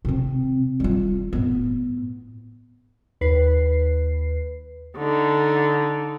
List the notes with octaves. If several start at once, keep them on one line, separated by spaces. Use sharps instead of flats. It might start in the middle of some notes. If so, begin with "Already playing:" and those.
C3 C4
G3 F4
A2 B3
D#2 B4 C7
D3 D#4